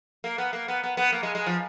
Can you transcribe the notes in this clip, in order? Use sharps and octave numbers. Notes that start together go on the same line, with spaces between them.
A#3
B3
A#3
B3
B3
B3
A#3
G#3
G#3
F3